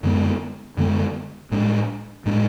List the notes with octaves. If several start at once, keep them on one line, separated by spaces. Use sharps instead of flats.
F#2 D3 G#3 B3
F#2 D3 G#3 B3
A2 G#3 D4
A2 G#3 D4